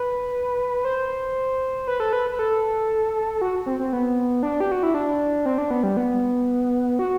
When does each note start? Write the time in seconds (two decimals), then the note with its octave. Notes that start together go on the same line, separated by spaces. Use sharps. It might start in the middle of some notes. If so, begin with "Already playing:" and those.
Already playing: B4
0.85 C5
1.88 B4
2.00 A4
2.13 B4
2.32 B4
2.39 A4
3.41 F#4
3.66 C4
3.79 C4
3.93 B3
4.43 D4
4.60 G4
4.72 F#4
4.83 E4
4.94 D4
5.46 C4
5.58 D4
5.71 B3
5.83 G3
5.97 B3
6.99 F#4